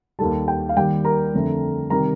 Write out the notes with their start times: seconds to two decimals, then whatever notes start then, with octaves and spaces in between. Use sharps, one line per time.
0.19 D#2 D#3 G3 A4 A5
0.48 G5
0.69 F5
0.76 D#2 D#3 G3 G5
1.04 A#4 A#5
1.34 F2 D3 A3
1.90 C3 D#3 G3 A#4 A#5